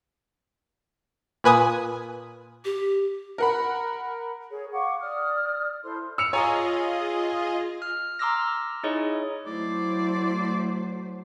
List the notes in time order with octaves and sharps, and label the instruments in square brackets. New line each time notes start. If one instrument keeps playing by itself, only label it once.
[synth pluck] A#2 B4 G#5 D#6
[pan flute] G4
[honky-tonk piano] A#4 F#5 B5
[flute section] G#4 C#5
F5 F#5 C#6 D6
D5 D#6 F6
E4 A4 C5 C6
[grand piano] E6 C#7 F7
[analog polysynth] F4 G#4 D#5 [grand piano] C#5 G#5 A#5
[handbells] F6
A#5 C6 D6 E6 F6 A#6
D#4 E4 G#4 C#5 D#5
[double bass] F#3 [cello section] A3 C5 [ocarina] E4 [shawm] D5